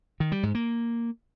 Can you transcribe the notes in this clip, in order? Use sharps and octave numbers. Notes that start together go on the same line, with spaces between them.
D#3
G3
G#2
A#3